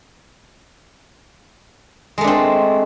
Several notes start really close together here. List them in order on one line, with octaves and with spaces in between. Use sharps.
G#3 A3 D4 C4